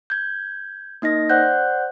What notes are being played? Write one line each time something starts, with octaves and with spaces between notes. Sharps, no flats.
G6 G#6
A#3 D#4 D#5 A#6
C5 D5 F#5 F#6 G6